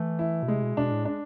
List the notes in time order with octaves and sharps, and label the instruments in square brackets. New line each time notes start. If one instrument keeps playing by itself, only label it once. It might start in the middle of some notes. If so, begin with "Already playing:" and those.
Already playing: [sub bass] E3 [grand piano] A3
[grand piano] E4
[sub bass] B2
[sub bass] C3 [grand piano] G#3
[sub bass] B2
[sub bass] B2 [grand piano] D4
[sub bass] A2
[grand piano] D4